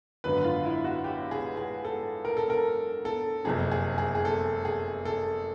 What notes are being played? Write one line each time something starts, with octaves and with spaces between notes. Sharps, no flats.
G#1 F#2 D3 B4
F4
E4
F#4
G4
G#4
G#4
A4
A#4
A4
A#4
A4
F#1 F2 C3 G#4
G#4
G#4
G#4
A4
G#4
A4